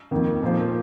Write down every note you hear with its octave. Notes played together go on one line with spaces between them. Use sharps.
F2 D#3 A#3
A#2 F3 A#3 F4 C5